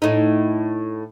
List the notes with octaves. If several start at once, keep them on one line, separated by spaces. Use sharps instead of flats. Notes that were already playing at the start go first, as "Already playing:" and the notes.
A2 D#4